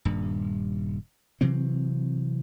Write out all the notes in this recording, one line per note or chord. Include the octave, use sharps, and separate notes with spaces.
D#1 G2
C3 E3 F#3 C4